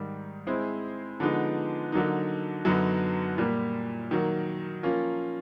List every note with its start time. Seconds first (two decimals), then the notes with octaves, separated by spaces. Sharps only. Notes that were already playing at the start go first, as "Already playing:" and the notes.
Already playing: G#2 D#3 G3
0.47 G#3 C4 E4 G#4 C5
1.20 D3 F3 G#3 B3 D#4
1.92 D3 F#3 A#3 D#4
2.65 F#2 D3 F#3 B3 D#4
3.38 A#2 G3 A#3
4.11 D#3 F#3 A#3
4.83 F3 A#3 C#4 F4